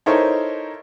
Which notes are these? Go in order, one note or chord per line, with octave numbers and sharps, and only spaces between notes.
D#4 E4 A4 A#4 C5 C#5